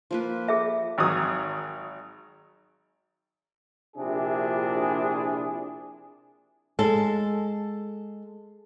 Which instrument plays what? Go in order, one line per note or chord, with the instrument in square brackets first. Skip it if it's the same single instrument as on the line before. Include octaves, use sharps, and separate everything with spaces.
[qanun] F3 A#3 B4
[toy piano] G#4 E5
[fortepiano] G#1 F#3 D#6
[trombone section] A#1 C3 D4 E4 G#4
[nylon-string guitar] G#3 A4